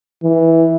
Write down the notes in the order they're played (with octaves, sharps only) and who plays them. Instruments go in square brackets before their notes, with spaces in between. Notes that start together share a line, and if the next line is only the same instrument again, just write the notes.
[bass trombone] E3